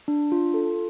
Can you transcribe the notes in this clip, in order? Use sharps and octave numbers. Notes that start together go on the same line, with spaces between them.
D4
F4
A4